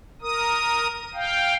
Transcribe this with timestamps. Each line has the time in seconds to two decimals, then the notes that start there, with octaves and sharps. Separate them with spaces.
0.22 A#4 D#6
1.14 F5 G5